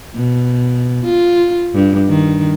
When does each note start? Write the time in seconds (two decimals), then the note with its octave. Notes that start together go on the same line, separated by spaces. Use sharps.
0.14 B2
1.05 F4
1.74 G2
2.09 D#3